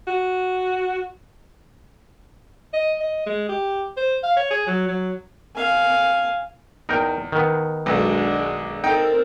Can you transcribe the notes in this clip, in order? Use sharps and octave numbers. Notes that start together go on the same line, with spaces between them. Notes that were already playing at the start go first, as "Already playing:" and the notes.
F#4
D#5
D#5
G#3
G4
C5
F5
C#5
G#4
F#3
F#3
F5 G#5
E2 D#4 A#4 G5
D#3 B3
B1 G#3 D4 F#4
C4 D#4 A4 A#4 G5